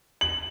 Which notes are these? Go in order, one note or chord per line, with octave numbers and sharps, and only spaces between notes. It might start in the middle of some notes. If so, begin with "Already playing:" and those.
F#7